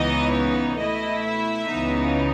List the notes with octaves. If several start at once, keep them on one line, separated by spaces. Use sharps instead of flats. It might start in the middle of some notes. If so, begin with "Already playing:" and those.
Already playing: C#2 C#3 E3 B3 D#4 D#5
C#5
B2 A3 E4 D#5
E5
C#2 C#3 E3 B3 D#4